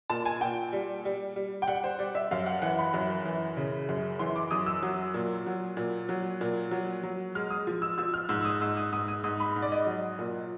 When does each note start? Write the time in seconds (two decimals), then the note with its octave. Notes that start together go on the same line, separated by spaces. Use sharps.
0.10 A#2 A5
0.25 G#5
0.41 A#2 G5
0.73 G3
1.05 G3
1.36 G3
1.62 G5
1.68 G3 F#5
1.84 C5
1.99 G3 D5
2.15 E5
2.31 F#2 F5
2.46 F#5
2.62 E3 F#5
2.79 B5
2.94 F#2
3.25 E3
3.57 C#3
3.89 F#2
4.19 E3 C6
4.36 D6
4.51 F#2 D#6
4.66 E6
4.83 F#3
5.14 A#2
5.46 F#3
5.77 A#2
6.09 F#3
6.41 A#2
6.71 F#3
7.03 F#3
7.35 G#3 F6
7.50 D#6
7.67 F3
7.82 E6
7.98 F3 E6
8.14 F6
8.29 G#2 E6
8.41 E6
8.45 D#6
8.61 G#2 E6
8.77 D#6
8.93 G#2 D#6
9.08 D#6
9.24 G#2 D#6
9.40 B5
9.56 G#2
9.62 D5
9.72 D#5
9.86 F#3
10.19 A#2